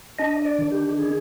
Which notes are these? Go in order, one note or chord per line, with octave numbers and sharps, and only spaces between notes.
D4 D#5
D#5
D5
D#3
G4
G#4